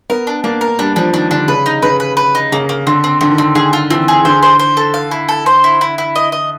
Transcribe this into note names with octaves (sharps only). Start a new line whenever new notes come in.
B3 A#4
D4
A#3 D4
A#4
G3 D4
F3 D4
D#3 D4
D3 D4
C#3 B4
D#4
C#3 B4
B4
B4
D#4
C#3 A#3
A#3
D3 C4
C4
D3 C4
D#3
D3 C4
D3 G#4
F4
E3 C4
G#4
D3 C5
C5
C5
A4
F5
E4
A4
C5
E4
E4
E4
D#5
D#5